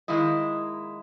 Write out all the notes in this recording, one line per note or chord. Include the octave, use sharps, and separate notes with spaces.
D#3 G#3 A#3 E4 D#5